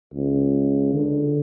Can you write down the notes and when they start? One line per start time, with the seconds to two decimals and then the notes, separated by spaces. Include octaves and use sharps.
0.14 C#2
0.93 D3